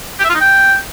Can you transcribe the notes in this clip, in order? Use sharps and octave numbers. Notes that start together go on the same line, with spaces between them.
G4
E5
F4
D#4
G5